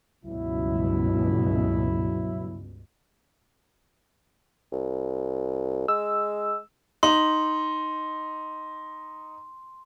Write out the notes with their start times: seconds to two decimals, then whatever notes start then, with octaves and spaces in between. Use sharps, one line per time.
0.25 C#2 G2 B2 F#3 E4
4.72 C2
5.88 G#3 E6
7.03 D#4 C6